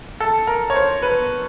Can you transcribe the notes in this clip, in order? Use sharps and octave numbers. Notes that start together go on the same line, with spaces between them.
A4
A#4
C#5
C5
B4